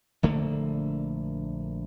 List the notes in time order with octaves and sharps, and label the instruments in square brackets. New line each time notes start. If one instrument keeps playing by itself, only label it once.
[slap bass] A#1 D3 A3 A#3